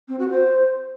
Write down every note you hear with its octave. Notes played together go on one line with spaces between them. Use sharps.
C4
F#4
C5